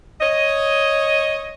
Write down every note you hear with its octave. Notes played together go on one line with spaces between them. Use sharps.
C#5 D#5